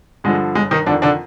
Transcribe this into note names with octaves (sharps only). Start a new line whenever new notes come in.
G2 D3 F3 G#3
G1 G#3
D#3 D#4
F2 D3 D#3 D4
D3 D4